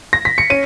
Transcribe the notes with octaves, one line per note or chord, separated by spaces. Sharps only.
A#6
B6
C#7
C#4 D#7